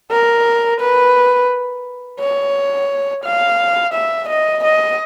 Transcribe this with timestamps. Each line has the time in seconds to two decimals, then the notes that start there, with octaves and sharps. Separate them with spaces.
0.11 A#4
0.81 B4
2.20 C#5
3.24 F5
3.94 E5
4.29 D#5
4.64 D#5